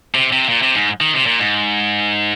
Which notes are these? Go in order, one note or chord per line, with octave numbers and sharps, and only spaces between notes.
C3
C3
A#2
C3
G#2
D#3
C3
A#2
G#2